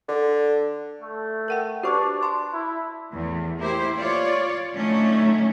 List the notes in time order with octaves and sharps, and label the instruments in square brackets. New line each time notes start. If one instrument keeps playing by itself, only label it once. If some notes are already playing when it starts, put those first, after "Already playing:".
[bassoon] D3
[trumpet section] A3
[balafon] A#4 F#5 G5
[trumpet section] D4 [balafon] F#4 B4 [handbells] G4 C5 C#6
[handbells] A5 C6 F#6
[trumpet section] E4
[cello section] E2 A2
A#3 E4 G4 C5
F4 C#5 D5
A2 D3 F#3 A3 C#4 D#4